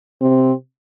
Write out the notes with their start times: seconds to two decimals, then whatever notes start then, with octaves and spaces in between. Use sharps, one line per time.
0.21 C3 C4